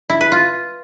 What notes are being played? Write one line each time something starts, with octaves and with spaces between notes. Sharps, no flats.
E4
B4
F4